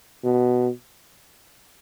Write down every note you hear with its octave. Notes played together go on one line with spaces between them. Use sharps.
B2